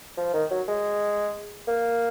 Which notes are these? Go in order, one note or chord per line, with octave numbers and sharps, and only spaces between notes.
F3
D#3
F#3
G#3
A#3